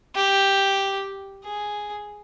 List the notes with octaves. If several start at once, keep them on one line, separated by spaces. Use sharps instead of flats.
G4
G#4